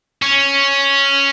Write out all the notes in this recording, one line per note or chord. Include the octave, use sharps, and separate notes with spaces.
C#4